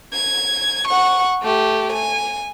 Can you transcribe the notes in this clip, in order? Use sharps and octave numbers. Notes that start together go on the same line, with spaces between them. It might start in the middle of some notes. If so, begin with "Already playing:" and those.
G#6
F#5 C#6
A3 G4
G#5